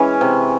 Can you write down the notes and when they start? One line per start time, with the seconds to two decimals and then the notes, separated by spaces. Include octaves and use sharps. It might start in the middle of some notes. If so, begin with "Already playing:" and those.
Already playing: E3 G#3 C#4
0.21 C3